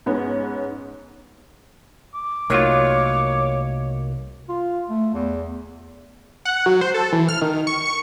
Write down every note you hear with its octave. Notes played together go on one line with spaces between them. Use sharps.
G#2 B3 C#4
D6
C2 D#3 F#3 A3 A#3 F4 C#5
F4
A3
E2
F#5
F#3
C5
A4
E3
F6
D#3
C#6
C#6